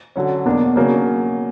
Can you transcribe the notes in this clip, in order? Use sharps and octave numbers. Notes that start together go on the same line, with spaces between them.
D3 F#3 C#4
E2 B2 A#3 D4
C#3 F#3 A#3